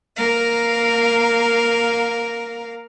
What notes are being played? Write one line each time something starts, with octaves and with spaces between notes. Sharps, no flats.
A#3 A#4 F5